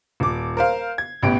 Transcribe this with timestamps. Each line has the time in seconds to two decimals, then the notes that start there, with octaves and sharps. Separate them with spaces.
0.20 D#1 D6
0.57 A#4 C5 F5
0.98 G#6
1.23 A1 B2 B3 G4 D7